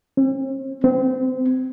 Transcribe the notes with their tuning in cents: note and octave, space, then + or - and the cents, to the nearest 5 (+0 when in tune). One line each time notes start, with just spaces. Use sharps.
C4 +45
C4 -25